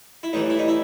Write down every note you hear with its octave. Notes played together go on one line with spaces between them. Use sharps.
E4
A2 E3 G3 D#4
E4
D#4
E4